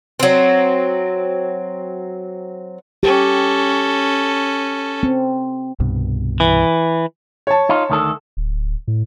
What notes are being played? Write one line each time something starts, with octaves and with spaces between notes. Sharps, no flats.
F#3 C4
C#4 G4 A4
C4
C2 G2 B2
E3
C#5 A5
D#4 F4
D2 D#3 A4
D1
A2